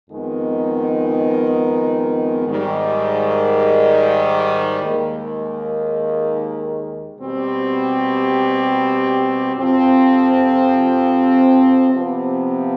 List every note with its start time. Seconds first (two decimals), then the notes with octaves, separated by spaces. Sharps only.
0.10 F2 D#3 G#3 B3 D#4
2.47 G#2 D#3 G3
4.83 D#2 D#3 G#3
7.19 B2 G3 C4 G4
9.55 F2 C3 F3 C4
11.91 C3 F3 B3